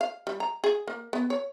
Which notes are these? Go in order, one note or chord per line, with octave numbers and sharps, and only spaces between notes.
F5
G3
A#5
G#4
A#3
B3
C#5